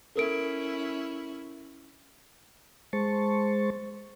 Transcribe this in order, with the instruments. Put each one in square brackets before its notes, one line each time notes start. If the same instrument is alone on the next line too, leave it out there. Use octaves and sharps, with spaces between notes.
[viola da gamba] C#4 E4 [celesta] A4 A#4 D7
[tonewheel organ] G#3 C5 A5 C#6